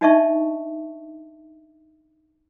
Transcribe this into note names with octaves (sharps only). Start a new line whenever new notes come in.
D4 D#4 D#5 E5 A5 C#6